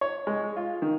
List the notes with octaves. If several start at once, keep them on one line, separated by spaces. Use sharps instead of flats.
C#5
G#3
F4
D#3